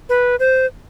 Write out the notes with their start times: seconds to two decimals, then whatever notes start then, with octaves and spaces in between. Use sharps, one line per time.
0.09 B4
0.40 C5